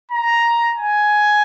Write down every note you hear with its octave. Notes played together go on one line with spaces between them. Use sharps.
A#5
G#5